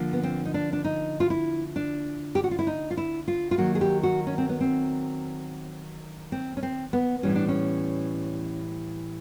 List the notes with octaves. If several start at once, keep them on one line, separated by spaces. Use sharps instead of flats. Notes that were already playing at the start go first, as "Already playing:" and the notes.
Already playing: D3 F3 A#3
B3
C4
D#4
D4
D4
D#4
F4
E4
D4
G4
F#4
F4
E4
D#4
F4
E4
F4
F4
D#3 F#3 A#3 F#4
G#4
G4
F#4
C#4
C4
B3
C4
C4
C#4
C4
B3
A2 E3 G3 C#4
D4
C#4